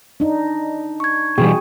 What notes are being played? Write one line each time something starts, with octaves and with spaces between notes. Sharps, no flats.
D4 D#4
C#6 G#6
B2 E3 G3 F#4 G#4 G5 C#6